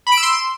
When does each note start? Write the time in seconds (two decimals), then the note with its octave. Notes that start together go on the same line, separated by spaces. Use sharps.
0.07 B5
0.12 D7
0.17 E6
0.23 C6